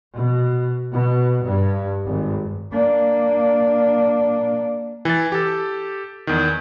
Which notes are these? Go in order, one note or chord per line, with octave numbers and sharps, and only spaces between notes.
B2
B2
G2
G#1
A#3 D4
E3 A6
G4 A4
E2 D#3